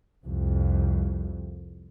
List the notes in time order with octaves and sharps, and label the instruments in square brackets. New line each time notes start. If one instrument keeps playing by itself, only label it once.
[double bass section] C2 F2